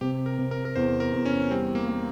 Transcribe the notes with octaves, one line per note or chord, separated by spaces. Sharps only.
C3 G4
A#4
C3
A#4
A#4
E2 C5
A#4
E2
C#4
G3 C4
A#3
A#3